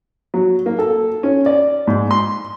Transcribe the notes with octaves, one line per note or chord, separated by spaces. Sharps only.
F#3
A#3
A4
C#4
D5
G#2
C6